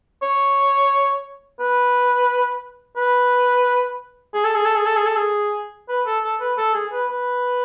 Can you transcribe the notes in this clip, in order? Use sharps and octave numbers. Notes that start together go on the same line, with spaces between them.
C#5
B4
B4
G#4
A4
G#4
A4
G#4
A4
G#4
A4
G#4
B4
A4
A4
B4
A4
G#4
B4
B4